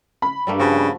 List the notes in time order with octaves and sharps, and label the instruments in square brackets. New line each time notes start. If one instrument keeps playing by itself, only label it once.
[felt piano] B5
[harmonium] G2 [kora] G3 A3 A#3
[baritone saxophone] C#3 [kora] F3 F#4